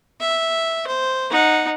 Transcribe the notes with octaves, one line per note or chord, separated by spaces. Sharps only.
E5
C5
D#4 F#5